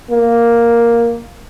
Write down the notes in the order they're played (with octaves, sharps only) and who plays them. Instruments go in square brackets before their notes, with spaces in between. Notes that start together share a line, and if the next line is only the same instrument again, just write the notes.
[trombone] A#3